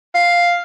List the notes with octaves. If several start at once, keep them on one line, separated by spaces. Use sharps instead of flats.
F5